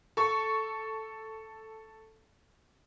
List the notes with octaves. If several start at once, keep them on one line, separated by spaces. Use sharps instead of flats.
A4 C#6